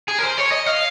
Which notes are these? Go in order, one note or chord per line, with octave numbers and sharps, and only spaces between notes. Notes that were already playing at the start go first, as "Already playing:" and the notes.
G#4
A#4
C5
C#5
D#5
F5